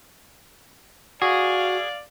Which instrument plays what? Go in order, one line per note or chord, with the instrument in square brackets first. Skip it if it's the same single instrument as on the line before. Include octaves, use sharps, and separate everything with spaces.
[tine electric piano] F#4 [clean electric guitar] G#4 [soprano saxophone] D5 [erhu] F5